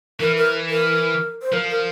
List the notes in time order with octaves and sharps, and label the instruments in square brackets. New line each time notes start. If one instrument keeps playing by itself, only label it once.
[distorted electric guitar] E3 [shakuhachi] A#4
[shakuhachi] A#4
A#4
C5
[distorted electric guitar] F3 [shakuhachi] A#4
[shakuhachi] A#4